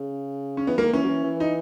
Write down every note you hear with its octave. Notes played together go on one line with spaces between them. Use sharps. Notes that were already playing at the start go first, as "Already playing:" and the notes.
Already playing: C#3
C#4
E3 B3
D#3 A#3
E3 C#4
F#3
E3
E3
D#4